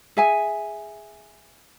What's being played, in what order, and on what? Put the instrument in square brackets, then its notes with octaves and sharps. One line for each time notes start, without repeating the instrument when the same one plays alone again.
[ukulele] G#4 E5 G#5